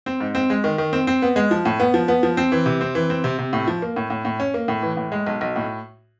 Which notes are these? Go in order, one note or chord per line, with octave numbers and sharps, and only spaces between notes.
C4
G#2
C4
G#3
D#3
D#3
C4
C4
B3
G#3
F3
A2
B3
F3
B3
F3
C4
E3
C3
C4
E3
C4
C3
C3
A2
F3
A#3
A2
A2
A2
C#4
A#3
A2
E3
A2
G#3
B1
B1
A2